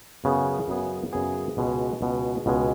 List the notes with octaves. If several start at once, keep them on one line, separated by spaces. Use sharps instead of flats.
F#2 C#3 B3 G#4
F#2 C#3 B3 G#4
F#2 C#3 B3 G#4
C#2 B2 G#3
C#2 B2 G#3
C#2 B2 G#3